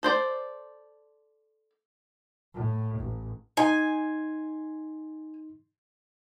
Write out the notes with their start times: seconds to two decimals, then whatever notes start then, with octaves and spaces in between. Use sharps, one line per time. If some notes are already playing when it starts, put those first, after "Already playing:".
0.03 A4 C5 D5
2.54 A2
3.00 A1
3.57 D#4 G#5 C6